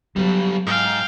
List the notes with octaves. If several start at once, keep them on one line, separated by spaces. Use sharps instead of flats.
F#3 G3 B3
G#2 F5 G5